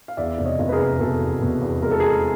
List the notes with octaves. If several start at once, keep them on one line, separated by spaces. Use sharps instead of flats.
F5
E2 D5 E5
F1
C#5 D#5
F1
B4
G#4 A#4
F1
B2 A4
E2
B2
E2
G#3 A#4
A4
G#3 G#4 A#4